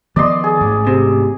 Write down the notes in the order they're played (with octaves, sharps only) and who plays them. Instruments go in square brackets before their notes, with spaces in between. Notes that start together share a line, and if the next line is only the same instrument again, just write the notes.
[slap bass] D#3 F3 B3 [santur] D5 D#5 C6
[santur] G#4
[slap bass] A1 G#2
[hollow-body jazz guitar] C3